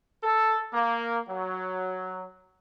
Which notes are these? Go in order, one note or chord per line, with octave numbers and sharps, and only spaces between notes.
A4
A#3
F#3